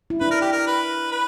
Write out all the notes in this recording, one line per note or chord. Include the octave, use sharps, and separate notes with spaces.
E4
D4 B4
A#4
G4
A#4
B4
B4